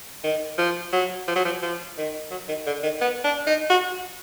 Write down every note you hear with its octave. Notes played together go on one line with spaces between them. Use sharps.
D#3
F3
F#3
F3
F#3
F3
F3
D#3
F#3
D#3
D3
D#3
B3
D4
D#4
F#4